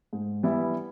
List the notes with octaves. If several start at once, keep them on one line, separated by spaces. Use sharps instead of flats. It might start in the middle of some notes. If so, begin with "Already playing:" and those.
G#2
E3 G3 B3 E4